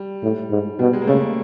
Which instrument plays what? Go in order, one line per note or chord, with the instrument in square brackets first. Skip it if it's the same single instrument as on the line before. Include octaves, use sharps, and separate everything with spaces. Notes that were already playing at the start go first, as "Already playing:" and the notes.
Already playing: [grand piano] G3
[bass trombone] A2
G#2
[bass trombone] B2 [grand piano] G3
[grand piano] G#3
A#3
[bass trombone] C#3 [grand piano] A3
[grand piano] A#3